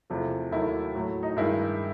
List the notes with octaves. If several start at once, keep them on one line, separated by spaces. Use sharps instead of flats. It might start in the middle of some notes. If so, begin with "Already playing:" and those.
E2 C3 F3 A3
D#2 D#3 F#3 A3 E4
A2 F#3 A3
D#4
G2 D#3 G#3 E4